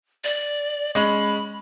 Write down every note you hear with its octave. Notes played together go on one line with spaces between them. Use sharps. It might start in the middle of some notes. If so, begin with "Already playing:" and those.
D5
G#3 C#4 B5